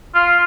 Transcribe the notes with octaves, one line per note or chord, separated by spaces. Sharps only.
F4